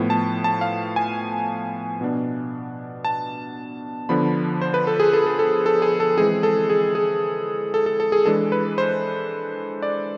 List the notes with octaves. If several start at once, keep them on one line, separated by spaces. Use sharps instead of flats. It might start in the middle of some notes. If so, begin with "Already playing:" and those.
Already playing: A2 F3 B3
A5
A5
F5
G#5
B2 B3 D4
A5
D3 F3 B3 D4 B5
C5
B4
A4
G#4
A4
A4
A4
A4
G#4
A4
E3 G#3 C4 G#4
A4
G#4
G#4
A4
A4
A4
G#4
E3 G#3 D4 A4
B4
C5
D5